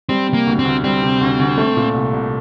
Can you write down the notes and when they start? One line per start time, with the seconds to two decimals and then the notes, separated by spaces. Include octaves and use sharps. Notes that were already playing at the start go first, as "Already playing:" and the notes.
0.09 G3 C4
0.29 C3
0.34 A#3
0.47 D2
0.59 C4
0.65 D2
0.84 G3 C4
1.02 C3
1.21 D2
1.40 D2
1.58 A3
1.77 A#2
1.94 C2
2.13 C2